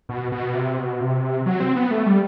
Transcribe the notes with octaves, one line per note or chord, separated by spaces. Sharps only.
B2
B2
C3
B2
C3
F#3
C4
B3
A3
G3